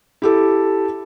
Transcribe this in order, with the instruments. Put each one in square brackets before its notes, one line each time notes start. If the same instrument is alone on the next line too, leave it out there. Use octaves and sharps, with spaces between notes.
[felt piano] E4 G4 A4